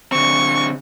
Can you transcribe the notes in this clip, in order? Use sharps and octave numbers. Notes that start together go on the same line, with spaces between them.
D3 C4 C#6